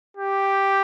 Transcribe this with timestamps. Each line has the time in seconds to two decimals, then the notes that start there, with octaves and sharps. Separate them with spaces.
0.17 G4